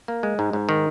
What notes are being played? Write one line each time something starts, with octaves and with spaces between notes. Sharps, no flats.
A#3
G#3
G#2
G#2
D#3